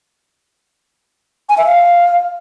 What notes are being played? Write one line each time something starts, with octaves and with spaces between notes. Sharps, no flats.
G#5
E5
F5